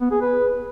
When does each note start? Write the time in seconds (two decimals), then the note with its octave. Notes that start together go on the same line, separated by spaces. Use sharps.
0.01 B3
0.11 G#4
0.21 B4